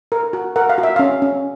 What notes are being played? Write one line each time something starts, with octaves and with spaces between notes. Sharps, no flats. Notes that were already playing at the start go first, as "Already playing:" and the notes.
A#4
F#4
A#4 F#5
F5
F#4
E5
C#4 F5
C#4